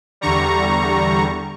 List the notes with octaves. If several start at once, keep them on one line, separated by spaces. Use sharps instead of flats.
E2 D3 G3 A#5 C#6